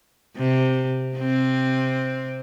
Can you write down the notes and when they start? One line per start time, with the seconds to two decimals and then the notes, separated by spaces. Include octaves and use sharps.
0.37 C3
1.17 C3 C4